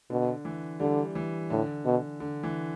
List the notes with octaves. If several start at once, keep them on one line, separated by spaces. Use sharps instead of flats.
B2 D3
E3
D3 G3
E3
A2 D3
B2
D3
E3